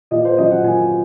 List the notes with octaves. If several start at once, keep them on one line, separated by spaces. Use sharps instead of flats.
A#2 D#5
C5
F#3 C#4 D#5
F#5
A#2 G#5